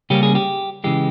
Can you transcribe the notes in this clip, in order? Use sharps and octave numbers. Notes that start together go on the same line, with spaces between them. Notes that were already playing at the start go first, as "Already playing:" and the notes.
C#3 G3 A#3 C#4 G4
G#4
G4
C#3 E3 G#3 G4